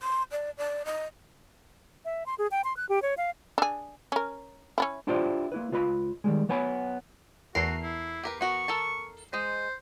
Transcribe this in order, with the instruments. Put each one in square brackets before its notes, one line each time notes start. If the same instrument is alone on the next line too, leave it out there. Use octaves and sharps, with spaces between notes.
[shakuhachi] C6
D5
D5
D#5
[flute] E5
C6
G#4
G5
C6
F#6
G4
C#5
F5
[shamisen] D4 G#4
C#4 A#4
C#4 D4 E4
[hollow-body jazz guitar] D4 E4 F4 G4 C5 D5
A#3 E4 B4
C#2 F4 B4 D#5 B5
D#3 F3 G3 G#3
F#3 B3 C#5 G#5 A#5 B5
[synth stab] E2 C7 [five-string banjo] A3 A#4 [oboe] F#4
[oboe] E4
[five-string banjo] G4 A#4 B4
[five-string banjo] B3 F#4 A#4 [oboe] C#6
[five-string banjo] A4 A#4 A5
[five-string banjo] G#3 D#5 [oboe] C5